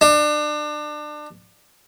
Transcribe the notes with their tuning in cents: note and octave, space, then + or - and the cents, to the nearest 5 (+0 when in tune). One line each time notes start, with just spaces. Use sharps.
D4 +30